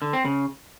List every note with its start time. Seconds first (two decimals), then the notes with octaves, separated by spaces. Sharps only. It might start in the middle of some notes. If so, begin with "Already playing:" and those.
0.02 D3
0.13 C4
0.25 C#3